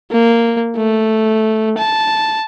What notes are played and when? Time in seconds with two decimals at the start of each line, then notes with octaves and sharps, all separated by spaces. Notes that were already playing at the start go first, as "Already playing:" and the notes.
0.12 A#3
0.77 A3
1.78 A5